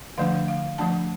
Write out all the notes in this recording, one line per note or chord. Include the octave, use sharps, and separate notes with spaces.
D3 F3 A3 D4 F5
F5
F3 A3 D4 A5